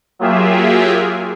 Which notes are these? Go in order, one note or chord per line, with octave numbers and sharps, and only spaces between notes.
F#3 A#3 F4 G4 G#4 E5